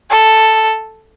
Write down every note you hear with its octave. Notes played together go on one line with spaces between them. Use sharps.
A4